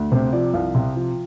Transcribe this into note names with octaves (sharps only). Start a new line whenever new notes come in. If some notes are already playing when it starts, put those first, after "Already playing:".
Already playing: D2
C3 C5
F3 D5
C2 F5
C3
F3